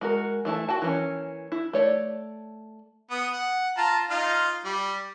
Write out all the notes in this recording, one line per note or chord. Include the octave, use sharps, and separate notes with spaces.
G#3 F#4 A#4
E3 A3 E4 A5
F#4 G5 A5
E3 A#3 B3 C#4
E4
A3 C#5 D5
B3 D#6
F#5
F4 A5 A#5
D#4 F4 F5
G3